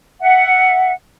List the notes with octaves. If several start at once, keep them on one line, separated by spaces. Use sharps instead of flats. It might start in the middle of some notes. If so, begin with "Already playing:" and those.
E5 F#5